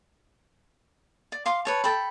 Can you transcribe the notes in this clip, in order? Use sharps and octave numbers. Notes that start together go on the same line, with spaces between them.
D5
F5 C6 D6
B4 C#5 A5
A4 G5 B5